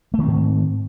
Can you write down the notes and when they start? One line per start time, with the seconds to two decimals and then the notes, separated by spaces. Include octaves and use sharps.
0.14 A3
0.18 D#3
0.23 C4
0.28 G#2